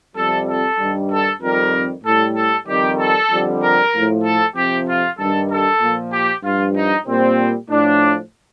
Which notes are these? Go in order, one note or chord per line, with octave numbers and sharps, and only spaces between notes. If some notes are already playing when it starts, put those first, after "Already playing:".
F2 C3 G3 A4
A4
G2 D#3 G3
A4
F2 D#3 G3 A#4
A2 G3 A4
A4
F2 D#3 G3 G4
A4
F2 D3 G3
A#4
A2 F3
A4
F2 C3 F3 G4
F4
G2 D#3 G3 A4
A4
A#2 F3
G4
G2 F3 F4
D#4
A#2 G3 C4
A2 F3 D4